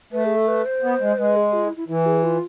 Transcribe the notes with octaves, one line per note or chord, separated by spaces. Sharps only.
A3 B4
G#4
A4
B4
C5
B3
G#3
G#3 B4
G#4
F4
E4
E4
E3 E4
G#4
F4